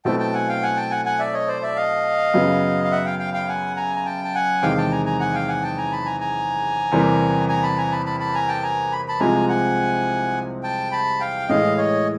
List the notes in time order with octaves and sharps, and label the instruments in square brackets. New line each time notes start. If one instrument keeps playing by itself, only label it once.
[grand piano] B2 F#3 A3 C4 E4 [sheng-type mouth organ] G5 A5
[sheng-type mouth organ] G5 A5
F#5 G#5
F5 G5
F#5 G#5
G5 A5
F#5 G#5
F#5 G#5
D5 E5
C#5 D#5
C5 D5
D5 E5
D#5 F5
[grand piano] F#2 C#3 F#3 B3
[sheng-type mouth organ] F5
E5 F#5
F5 G5
F5 G5
F5 G5
F#5 G#5
G#5 A#5
A#5
G5 A5
A5
F#5 G#5
[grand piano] E2 C3 D#3 G#3 [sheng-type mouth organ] F5 G5
[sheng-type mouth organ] G5 A5
G#5 A#5
G#5 A#5
F#5 G#5
F5 G5
F#5 G#5
G5 A5
G#5 A#5
A5 B5
G#5 A#5
G#5 A#5
[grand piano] E2 C3 E3 G3 A#3
[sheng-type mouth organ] G#5 A#5
A5 B5
G#5 A#5
A5 B5
A5 B5
A5 B5
G#5 A#5
G5 A5
G#5 A#5
B5
A5 B5
[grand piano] C2 C3 F3 G#3 C4 [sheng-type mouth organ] G#5 A#5
[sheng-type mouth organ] F#5 G#5
G5 A5
A5 B5
F5 G5
[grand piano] A2 E3 G#3 [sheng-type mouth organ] D#5 F5
[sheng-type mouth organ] C#5 D#5